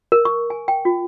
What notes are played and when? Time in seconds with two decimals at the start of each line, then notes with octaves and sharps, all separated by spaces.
0.12 A#4
0.25 C#6
0.50 G#5
0.68 G5
0.85 F4